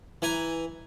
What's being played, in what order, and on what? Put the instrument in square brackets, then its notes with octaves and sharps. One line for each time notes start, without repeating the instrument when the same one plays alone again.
[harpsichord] E3 G#5 A#5